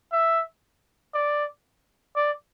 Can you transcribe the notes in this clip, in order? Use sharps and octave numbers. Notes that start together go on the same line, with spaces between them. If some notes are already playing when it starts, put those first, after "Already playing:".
E5
D5
D5